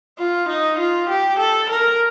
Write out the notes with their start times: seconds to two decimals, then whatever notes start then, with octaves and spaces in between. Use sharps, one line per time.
0.19 F4
0.48 D#4
0.79 F4
1.09 G4
1.39 A4
1.69 A#4